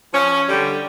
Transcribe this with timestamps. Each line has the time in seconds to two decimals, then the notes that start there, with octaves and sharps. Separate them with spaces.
0.14 F3 C#4
0.49 D3 G3